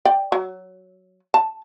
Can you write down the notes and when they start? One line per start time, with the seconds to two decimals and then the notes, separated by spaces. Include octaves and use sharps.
0.05 D5 G5
0.32 F#3
1.34 A5